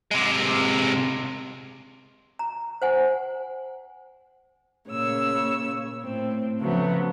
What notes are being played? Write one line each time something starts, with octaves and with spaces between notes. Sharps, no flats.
C3 G#3
A#5
C5 F#5 G#5
A#2 C#3 C#5 E6
A2 C4
C#3 F3 F#3 A3 B3